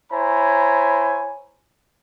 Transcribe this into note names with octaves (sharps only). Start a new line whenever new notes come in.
E4 C5 C#5 G#5 A#5 B5